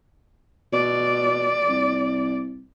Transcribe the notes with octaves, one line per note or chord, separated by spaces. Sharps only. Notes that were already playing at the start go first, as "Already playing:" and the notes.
B2 D5
C2